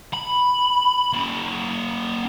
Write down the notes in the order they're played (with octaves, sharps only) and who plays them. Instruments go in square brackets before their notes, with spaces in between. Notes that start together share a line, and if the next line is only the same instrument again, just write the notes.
[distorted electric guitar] B5
A#3 C#4